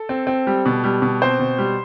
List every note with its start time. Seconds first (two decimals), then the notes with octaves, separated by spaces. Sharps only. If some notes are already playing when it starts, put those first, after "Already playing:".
Already playing: A4
0.09 C4
0.27 C4
0.47 G3
0.66 B2
0.84 G3
1.02 B2
1.22 C4 C5
1.39 B2
1.58 G3